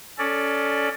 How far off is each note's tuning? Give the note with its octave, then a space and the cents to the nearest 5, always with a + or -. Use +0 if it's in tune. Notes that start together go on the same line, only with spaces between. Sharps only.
C#4 +20 A4 +0 D5 +15